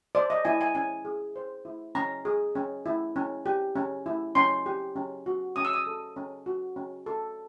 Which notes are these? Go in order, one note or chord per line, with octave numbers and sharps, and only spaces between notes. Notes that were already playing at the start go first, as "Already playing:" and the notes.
C5 D5
D#5
E4 G#5
G#5
C#4 G#5
G#4
C5
E4
C#4 A#5
G#4
C#4
E4
C#4
G4
C#4
E4
C#4 C6
G4
C#4
F#4
C#4 D#6
E6
D#6
A4
C#4
F#4
C#4
A4